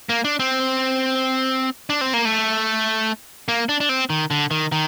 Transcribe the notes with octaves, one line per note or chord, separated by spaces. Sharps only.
A#3
D4
C4
D4
C4
A#3
A3
A#3
D4
D4
C4
D#3
D3
D#3
D#3